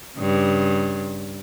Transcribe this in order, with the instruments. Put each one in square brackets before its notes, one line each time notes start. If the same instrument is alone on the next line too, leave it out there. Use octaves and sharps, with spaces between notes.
[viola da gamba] G2 C#3